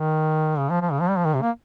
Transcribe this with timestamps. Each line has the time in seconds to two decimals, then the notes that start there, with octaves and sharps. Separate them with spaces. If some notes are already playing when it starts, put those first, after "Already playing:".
Already playing: D#3
0.59 C#3
0.70 F3
0.82 F3
0.92 C#3
1.01 F3
1.09 G3
1.18 F3
1.25 D#3
1.35 C3
1.42 A#3